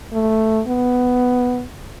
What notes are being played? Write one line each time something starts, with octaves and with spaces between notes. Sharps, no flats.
A3
B3